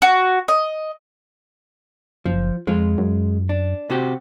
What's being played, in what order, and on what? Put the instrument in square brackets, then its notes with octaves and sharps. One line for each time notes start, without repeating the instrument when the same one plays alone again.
[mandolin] F#4
D#5
[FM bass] F#1 [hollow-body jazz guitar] F3
[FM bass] F2 [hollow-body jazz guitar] G#3 F4
[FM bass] F#2
[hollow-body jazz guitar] D4
C3 F#4 G4